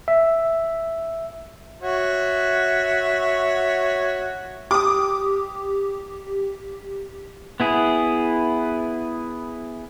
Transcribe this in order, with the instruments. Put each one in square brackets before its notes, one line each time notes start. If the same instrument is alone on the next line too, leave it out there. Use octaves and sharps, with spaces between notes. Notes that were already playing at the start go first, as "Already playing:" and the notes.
[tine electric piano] E5
[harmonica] F#4 C#5 E5
[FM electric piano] G4 [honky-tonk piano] D6 D#6
[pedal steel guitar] B3 E4 G#4